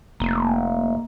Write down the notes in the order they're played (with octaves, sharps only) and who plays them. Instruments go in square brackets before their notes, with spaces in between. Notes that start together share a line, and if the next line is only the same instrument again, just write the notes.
[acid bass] F1 [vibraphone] A#3